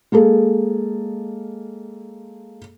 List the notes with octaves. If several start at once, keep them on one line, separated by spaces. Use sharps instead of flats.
G#3 A#3 G#4 A4